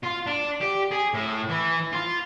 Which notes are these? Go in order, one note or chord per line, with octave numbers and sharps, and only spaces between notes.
F4
D4
G4
G#4
A2
E3
F4